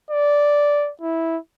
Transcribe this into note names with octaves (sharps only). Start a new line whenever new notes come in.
D5
E4